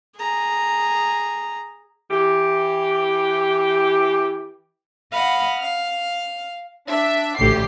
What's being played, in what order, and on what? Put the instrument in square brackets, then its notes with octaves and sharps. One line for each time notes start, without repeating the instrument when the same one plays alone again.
[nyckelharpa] G#4 A#5
[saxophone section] E3 G4
[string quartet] D#5 F5 F#5 B5
F5 F6
[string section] D4 E5
A1 D2 G4 C7